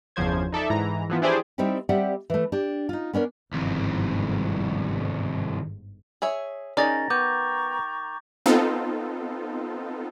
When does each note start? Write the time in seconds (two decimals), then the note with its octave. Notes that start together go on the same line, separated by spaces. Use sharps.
0.16 G1 E2 C#3 F3 C5 G#6
0.52 D#4 A4 D5 E5
0.70 G#2 E3 A#5
1.09 E3 F3 B3
1.22 D4 E4 G4 G#4 C5 D5
1.58 G3 C4 D#4 E4 G4
1.89 G3 C4 G4 D5 E5 F#5
2.30 E3 A3
2.52 D4 G4
2.89 D#4 F4
3.13 B3 C#4 D4 A#4
3.53 G1 C2 F2 G#2 D#3
6.22 G#4 C#5 E5
6.77 D#3 C#4 D#4 G#4 D5 A#5 A6 A#6
7.10 B3 G5 A#5 C#6 D6 G6
8.46 B3 C4 D#4 F4 A4